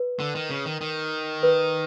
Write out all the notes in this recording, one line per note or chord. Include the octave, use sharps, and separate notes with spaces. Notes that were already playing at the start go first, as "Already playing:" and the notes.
Already playing: B4
D3
D#3
C#3
D#3
D#3
B4